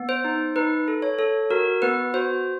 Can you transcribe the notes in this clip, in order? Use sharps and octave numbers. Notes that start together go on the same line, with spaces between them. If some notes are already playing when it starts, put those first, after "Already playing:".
Already playing: B3
C5
D#4
D#4 B4
A4
C#5
A4
F#4 A#4
B3 B4
F#4 C5